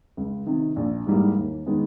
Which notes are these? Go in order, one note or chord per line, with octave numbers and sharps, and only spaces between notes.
C#2
C3 D#3
A#1
G#2 E3 G3 A#3
D#2
D#3 G#3 B3